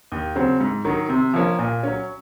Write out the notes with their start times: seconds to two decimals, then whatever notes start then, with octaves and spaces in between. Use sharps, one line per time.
0.12 D#2
0.36 C#3 F#3 C4
0.60 G#2
0.85 D#3 F#3
1.09 C3
1.34 F3 A#3 C#4
1.59 A#2
1.83 F#3 C#4